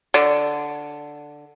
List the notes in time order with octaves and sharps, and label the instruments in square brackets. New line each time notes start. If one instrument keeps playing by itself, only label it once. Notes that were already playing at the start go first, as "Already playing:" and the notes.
[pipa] D3